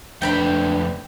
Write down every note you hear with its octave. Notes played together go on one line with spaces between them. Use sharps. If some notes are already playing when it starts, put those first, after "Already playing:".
F2 A3 D4 B4 G5 A#5 B5